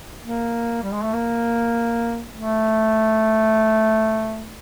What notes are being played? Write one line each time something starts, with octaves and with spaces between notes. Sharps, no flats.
A#3
G3
G#3
A3
A#3
A3